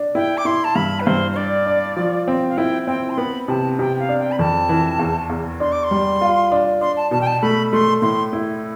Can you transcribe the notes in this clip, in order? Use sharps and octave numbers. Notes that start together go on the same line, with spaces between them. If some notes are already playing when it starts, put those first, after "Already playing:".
Already playing: D4
E4 G5
D6
E4 C6
A5
G2 B5
B4
G2 C5
C5
D4 D5
D4
F3
C4
F5
E4 G5
C4 G5
C6
B3 B5
C3 A5
C3 G5
F5
D4
G5
B5
F2 A5
E3
E2
E2
D4 C6
D6
C6
G3
F4
D4
D4 C6
A5
B2 A5
G5
A5
A3 B5
A3 C6
A2 C6
E4